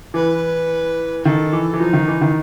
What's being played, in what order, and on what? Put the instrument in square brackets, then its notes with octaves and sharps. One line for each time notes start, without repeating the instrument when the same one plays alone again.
[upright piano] E3 [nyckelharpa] B4
[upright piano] D#3 [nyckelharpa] A4
[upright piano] E3
E3
[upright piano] F3 [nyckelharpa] D#4
[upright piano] D#3
E3
D#3